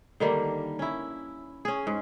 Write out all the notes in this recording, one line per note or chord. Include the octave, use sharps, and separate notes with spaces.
D3 D#3 G3 A#3
C#4 E4
C#4 G#4
G#2